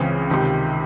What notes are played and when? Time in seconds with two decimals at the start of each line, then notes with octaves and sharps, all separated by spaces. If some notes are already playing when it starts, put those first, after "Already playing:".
Already playing: C#2 C#3 E3 C4
0.30 C#2 C3 D#3